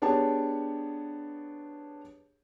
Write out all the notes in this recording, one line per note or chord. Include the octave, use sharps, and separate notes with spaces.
B3 D4 G4 G#4 C#5 A5